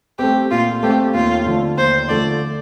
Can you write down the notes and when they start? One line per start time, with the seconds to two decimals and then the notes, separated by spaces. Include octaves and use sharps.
0.19 A3 C4 G4
0.51 A#2 F4
0.83 A3 C4 G4
1.14 D#2 F4
1.46 D3 F3 A3
1.77 D#2 C5
2.09 D3 F3 A3 D5